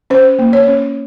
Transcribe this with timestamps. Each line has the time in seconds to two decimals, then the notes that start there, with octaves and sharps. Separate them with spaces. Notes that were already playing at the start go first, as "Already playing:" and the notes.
0.10 C#4 C5
0.39 A#3
0.53 C#5
0.68 C#4